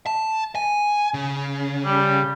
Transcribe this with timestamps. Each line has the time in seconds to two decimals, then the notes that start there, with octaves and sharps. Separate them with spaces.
0.06 A5
0.55 G#5
1.14 C#3
1.86 G3